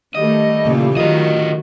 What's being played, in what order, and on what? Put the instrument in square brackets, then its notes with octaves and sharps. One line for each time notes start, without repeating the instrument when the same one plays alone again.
[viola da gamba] D#3 [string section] G3 A3 [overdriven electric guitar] D#5
[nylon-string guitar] A#2 C#3 E3 [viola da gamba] A#3 F4
[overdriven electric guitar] D3 D#5 [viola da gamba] D#3 F#3 F#4 [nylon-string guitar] F4 A#4